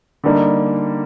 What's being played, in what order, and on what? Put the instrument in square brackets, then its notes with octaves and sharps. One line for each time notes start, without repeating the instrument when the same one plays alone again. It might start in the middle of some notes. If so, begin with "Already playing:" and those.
[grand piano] D3 G3 A#3 D#4